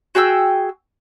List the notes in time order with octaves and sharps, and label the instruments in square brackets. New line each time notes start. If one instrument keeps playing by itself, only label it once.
[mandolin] F#4 G#4 G5 E6